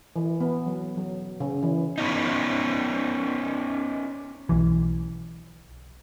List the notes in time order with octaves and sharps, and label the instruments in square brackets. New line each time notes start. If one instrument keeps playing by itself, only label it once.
[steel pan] E3
B3
F#3
F#3
C#3
E3
[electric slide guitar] B3 C#4 D#4
[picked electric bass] B1 E3